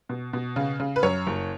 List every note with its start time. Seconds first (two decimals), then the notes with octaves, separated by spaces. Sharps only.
0.09 B2
0.33 B2
0.56 C#3
0.80 C#3
0.96 B4
1.03 F#2 C#5
1.27 F#1